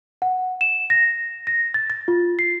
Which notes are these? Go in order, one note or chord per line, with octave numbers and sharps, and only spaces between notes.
F#5
E7
A#6
A#6
A6
A6
F4
C7